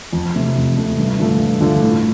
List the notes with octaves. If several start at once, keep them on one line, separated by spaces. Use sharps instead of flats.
F2
C3 A3
F2
C3 A3
G2
D3 F3 A3
G2
D3 F3 A3
A2